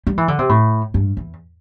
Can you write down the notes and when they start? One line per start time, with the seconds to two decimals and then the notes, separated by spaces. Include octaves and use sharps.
0.07 G3
0.18 E3
0.28 D3
0.39 C3
0.49 A2
0.94 G2
1.17 E2